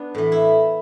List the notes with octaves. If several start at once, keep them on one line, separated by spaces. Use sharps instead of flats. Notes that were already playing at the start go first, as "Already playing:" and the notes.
Already playing: B3 D4
A2 E3
E4